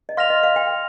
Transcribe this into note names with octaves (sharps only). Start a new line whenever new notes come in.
D#5
F5 C6 F6 A#6 F7
D#5
F5
G5